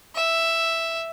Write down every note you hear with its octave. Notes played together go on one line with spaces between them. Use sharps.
E5